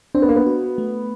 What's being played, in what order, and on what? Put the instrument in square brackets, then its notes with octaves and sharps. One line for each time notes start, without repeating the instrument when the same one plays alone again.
[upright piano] C4 [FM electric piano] D4
[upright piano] B3
A#3
B3
[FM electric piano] F#4
A3